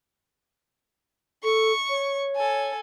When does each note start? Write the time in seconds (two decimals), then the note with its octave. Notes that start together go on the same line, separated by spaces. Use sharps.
1.44 A4 C#6
1.89 C#5
2.36 A4 G#5